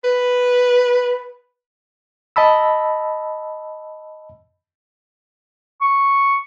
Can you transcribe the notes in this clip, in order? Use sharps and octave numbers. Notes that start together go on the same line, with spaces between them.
B4
D#5 A5 B5 E6
C#6